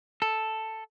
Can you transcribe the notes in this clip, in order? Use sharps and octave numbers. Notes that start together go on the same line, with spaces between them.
A4